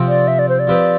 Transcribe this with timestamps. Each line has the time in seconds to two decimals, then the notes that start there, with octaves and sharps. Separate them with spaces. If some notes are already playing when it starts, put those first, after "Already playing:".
Already playing: C3 F3 C4
0.08 D5
0.28 E5
0.39 D5
0.49 C5
0.59 D5
0.67 F3 C4 G4 B4